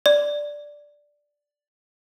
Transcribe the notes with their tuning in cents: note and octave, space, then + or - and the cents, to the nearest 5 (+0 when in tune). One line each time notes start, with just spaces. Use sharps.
D5 +0